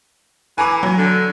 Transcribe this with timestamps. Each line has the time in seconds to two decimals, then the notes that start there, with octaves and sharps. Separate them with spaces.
0.58 E3 G#5 A#5 D6
0.83 F#3
0.98 D3